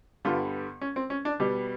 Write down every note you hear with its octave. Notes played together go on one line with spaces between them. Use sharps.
G2 D3 G3 B3 F4
C#4
C4
C#4
D4
B2 G3 B3 G4